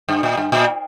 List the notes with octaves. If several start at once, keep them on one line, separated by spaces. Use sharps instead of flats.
G2
A#2
G2
A#2